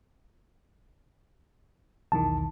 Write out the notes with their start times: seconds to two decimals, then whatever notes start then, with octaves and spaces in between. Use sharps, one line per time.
2.12 B1 E2 D#3 A5